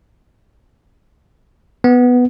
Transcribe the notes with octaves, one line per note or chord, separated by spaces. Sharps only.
B3